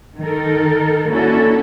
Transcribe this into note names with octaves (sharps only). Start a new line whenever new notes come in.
D#3 D#4 A4 A#4
A#3 C#4 D4 E4 F#4 A4